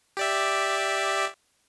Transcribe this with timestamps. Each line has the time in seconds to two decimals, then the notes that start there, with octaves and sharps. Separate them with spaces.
0.17 G4 D5 E5